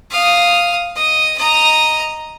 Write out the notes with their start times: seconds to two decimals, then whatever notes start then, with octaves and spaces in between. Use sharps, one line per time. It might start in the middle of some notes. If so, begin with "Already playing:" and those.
0.11 F5 D#6
0.96 D#5
1.38 D#5 A#5